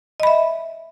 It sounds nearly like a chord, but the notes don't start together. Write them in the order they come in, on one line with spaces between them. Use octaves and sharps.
D#5 B5 E5